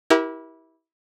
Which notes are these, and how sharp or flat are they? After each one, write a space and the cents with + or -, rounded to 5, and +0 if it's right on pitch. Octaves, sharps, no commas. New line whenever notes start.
E4 -20 G4 -15 A#4 +30